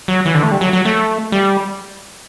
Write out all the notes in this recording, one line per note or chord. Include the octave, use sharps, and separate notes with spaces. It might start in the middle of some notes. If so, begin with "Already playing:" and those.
F#3
E3
D3
A3
G3
F#3
F#3
A3
G3